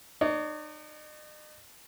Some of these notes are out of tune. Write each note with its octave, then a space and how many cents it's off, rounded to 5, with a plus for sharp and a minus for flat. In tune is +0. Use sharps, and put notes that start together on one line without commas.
D#4 -40 C#5 +40